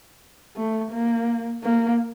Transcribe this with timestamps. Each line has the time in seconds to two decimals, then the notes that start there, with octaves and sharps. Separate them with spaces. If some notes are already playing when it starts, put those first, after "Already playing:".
0.56 A3
0.91 A#3
1.63 A#3